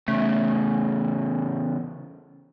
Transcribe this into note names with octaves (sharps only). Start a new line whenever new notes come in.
E2 C#3 A3